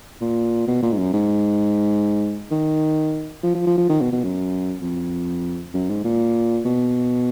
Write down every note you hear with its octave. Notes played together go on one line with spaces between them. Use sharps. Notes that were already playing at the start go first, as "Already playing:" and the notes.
A#2
B2
A#2
G#2
F#2
G#2
D#3
F3
F3
F3
F3
D#3
B2
B2
F#2
F2
F#2
G#2
A#2
B2